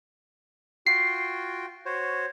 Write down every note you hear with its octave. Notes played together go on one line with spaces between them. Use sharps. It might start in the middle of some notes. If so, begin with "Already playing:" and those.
F4 F#4 G5 C7
F#4 C5 C#5